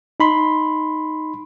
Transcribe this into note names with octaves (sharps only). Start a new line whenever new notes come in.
D#4 B5 C6